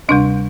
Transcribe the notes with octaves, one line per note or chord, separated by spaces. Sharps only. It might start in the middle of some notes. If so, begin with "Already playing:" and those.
D2 C3 G3 D4